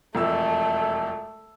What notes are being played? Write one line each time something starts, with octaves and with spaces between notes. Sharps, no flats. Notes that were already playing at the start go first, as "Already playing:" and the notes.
E1 F2 A3 E6